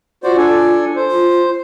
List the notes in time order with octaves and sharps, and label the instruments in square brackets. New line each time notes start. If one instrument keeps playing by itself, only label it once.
[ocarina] F4 [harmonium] F#4 C5 D5
[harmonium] D4 A4 G#5
C5
[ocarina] F4